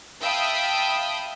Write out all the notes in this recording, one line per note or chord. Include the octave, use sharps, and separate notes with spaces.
E5 F5 G5 A5 B5 D#6